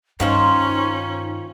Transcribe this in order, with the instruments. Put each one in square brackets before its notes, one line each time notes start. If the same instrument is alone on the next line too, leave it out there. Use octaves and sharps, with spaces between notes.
[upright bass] G2 [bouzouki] D#3 F4 C5 [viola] C#4 [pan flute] D#4